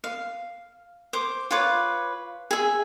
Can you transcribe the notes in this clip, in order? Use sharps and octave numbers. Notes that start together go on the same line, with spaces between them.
F5
C5 D6
F4 B4 C#5 D6
G#4 E5